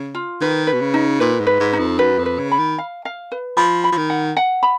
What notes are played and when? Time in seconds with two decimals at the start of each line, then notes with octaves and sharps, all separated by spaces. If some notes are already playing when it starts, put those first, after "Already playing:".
Already playing: C#3
0.15 F4
0.41 D#3 B4
0.67 B4
0.73 B2
0.81 C#3
0.94 D#4
1.20 A#2 B4
1.40 G#2
1.47 B4
1.60 G#2
1.73 D#4
1.79 F2
1.99 F#2 B4
2.19 F2
2.26 B4
2.39 C#3
2.52 B5
2.59 D#3
2.78 F5
3.05 F5
3.32 B4
3.57 F3 B5
3.84 B5
3.92 F3
3.97 D#3
4.10 F#5
4.37 F#5
4.63 B5